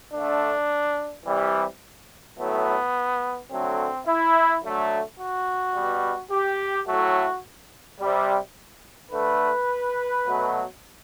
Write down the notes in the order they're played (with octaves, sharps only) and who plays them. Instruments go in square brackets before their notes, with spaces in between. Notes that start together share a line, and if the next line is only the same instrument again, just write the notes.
[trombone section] D3 A3 D4
C3 E3 G3
A2 F#3 A3 B3
D3 F#3 A3 C4
E4
D3 F#3 A3
F#4
B2 G3
G4
A2 F#3 A3 F#4
C3 G3
D3 A3 B4
B2 F#3 A3